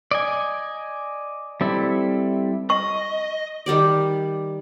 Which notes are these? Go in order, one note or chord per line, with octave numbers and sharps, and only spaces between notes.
D5 D#5 G#5
G3 C4 E4 A4
D#5 C#6
D#3 G3 G4 D5